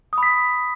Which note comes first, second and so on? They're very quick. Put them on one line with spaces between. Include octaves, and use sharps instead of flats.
D#6 B5 B6